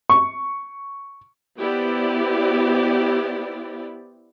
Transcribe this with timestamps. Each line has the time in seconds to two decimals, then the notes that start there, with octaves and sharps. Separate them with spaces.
0.10 C#6
1.59 B3 E4 G4 C5 D5